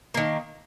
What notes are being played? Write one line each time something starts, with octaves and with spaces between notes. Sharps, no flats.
D#3 A#3